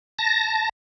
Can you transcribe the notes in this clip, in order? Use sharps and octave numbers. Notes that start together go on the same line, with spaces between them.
A5 A#6